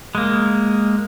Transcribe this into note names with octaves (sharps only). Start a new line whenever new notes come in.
G#3 A#3